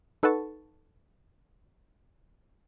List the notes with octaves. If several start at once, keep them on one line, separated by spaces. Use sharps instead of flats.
D#4 A4 B4 F#5 A5 C#6